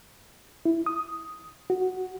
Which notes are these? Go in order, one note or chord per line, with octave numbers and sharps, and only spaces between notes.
E4
D#6
F#4